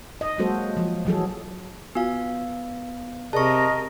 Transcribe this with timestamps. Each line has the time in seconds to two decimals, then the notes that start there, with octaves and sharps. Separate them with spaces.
0.21 D#5
0.38 F#3 G#3 A#3 F#4 A4 C5
0.77 F3
1.05 E3 F#3 G#4 A4
1.95 B3 F4 F#4 F5 G#5
3.33 C3 G#4 A#4 D5 D#5 A5 C#6